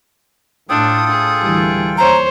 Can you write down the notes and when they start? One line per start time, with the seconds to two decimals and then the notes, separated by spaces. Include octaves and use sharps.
0.69 A2 D4 F4 A4 G5 D#6
1.10 G#4
1.42 D2 E3 G3
1.98 D#2 C5 C#5 A#5